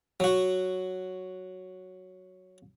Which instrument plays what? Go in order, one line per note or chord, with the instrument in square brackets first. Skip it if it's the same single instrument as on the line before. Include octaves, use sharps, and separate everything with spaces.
[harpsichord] F#3 F#4